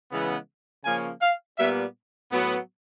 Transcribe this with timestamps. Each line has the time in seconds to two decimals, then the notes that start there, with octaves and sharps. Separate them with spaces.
0.11 C#3 E3 G#3 B3
0.85 C#3 F3 A#3 C#4 G#5
1.21 F5
1.58 A#2 G3 B3 E5
2.32 A2 F#3 B3